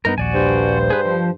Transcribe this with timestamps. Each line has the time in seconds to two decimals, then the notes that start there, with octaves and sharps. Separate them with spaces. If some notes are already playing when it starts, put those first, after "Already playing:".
0.05 G2 B3 D#4 A#4
0.18 D#1 A#1 F#4 D5 G#5
0.33 G2 C5
0.90 G#4 B4
1.05 F3